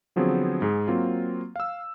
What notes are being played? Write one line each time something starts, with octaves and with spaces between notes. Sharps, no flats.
D3 F3 F#3 B3 C4 G#4
G#2 G#4
F#3 A#3 C4 F4
F5 E6